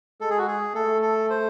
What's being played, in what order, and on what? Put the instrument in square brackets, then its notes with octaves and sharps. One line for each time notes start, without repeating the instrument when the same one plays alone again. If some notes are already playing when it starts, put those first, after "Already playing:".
[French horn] G#3 [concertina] A4
[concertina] G#4
F#4
G#4
[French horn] A3 [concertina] A4
[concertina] A4
C5